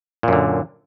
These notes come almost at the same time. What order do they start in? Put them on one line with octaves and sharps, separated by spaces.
A#2 F#2 D3